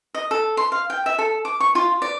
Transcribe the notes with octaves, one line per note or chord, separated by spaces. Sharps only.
D#5
A4
C6
F5
G5
E5
A4
D6
C#6
F4
D5